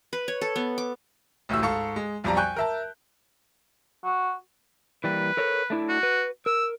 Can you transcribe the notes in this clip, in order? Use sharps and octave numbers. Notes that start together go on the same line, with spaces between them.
B4
C#5
A4
B3
D6
A1 D2 A3 E4 E6
G#2 A4 F5 C#6
G#3
B1 F2 G3 D5 A5 A#5
G5 G#5 C#6 F#6 G6
A#4 E5 A5
F#4
E3 G3 A#3 B4
A4 A#4 C#5
A3 D4 E4
F#4
B4
A#4 E6